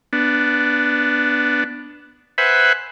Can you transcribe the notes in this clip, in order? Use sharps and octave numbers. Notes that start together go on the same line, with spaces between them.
B3 D4
B4 C5 E5 F#5 G#5 B5